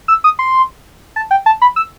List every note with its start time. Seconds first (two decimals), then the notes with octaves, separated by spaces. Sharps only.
0.08 E6
0.24 D#6
0.39 C6
1.16 A5
1.31 G5
1.46 A5
1.62 B5
1.76 E6